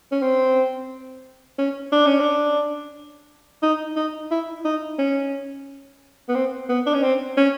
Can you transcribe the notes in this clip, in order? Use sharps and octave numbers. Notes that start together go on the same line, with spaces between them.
C#4
C4
C#4
D4
C#4
D4
D#4
D#4
E4
D#4
C#4
B3
C4
B3
D4
C#4
C4
C#4